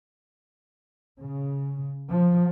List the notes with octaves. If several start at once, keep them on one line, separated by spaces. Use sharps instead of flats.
C#3
F3